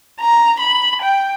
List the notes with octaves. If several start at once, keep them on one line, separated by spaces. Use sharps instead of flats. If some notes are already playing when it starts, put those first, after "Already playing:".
A#5
B5
G5